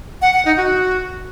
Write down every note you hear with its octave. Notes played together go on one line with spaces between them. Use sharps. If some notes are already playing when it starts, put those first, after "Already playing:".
F#5
F#5
D#4
F#4